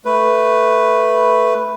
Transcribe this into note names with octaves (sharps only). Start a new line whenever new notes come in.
A3 B4